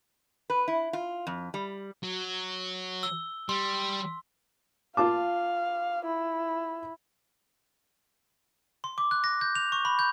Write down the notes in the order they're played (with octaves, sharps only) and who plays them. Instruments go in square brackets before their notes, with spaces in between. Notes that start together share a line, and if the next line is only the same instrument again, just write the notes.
[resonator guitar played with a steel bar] B4
E4
F4
F2
G3
[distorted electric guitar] F#3
[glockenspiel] E6 G7
[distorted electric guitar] G3 [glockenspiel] C6
[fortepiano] F4 A5 D6 [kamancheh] F5
[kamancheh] E4
[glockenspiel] C6
D6
F#6
A#6
G6
F7
C#6
B5
G6